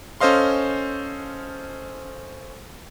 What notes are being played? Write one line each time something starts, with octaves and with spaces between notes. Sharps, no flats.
C#4 A4 C5 D#5 F5 C6